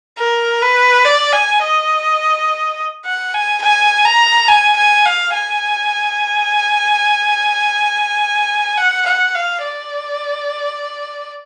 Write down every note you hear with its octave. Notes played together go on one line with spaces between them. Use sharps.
A#4
B4
D5
G#5
D#5
F#5
G#5
G#5
A#5
G#5
G#5
F5
G#5
F#5
F#5
F5
D5